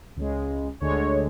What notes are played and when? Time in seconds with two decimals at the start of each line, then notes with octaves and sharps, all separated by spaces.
0.17 C#2 C#3 G#3
0.80 D2 D3 G#3 C#5